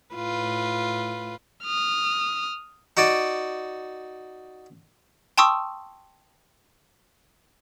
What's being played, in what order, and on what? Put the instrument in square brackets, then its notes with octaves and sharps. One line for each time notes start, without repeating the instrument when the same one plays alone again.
[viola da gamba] A2 F4 B4
[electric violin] D#6 F6
[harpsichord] D#4 F#4 D5
[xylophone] G5 A5 C6 C#6 D#6 E6